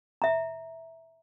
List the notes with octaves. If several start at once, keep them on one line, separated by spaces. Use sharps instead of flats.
E5 A#5